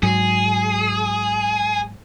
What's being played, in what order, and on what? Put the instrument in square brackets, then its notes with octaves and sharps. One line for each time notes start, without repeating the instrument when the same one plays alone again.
[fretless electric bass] G#2 F#3 [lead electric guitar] G#4